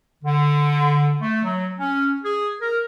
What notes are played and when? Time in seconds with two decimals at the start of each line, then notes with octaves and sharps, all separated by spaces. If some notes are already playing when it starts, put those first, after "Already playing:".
0.24 D3
1.22 A3
1.44 F#3
1.80 C#4
2.24 G#4
2.61 A#4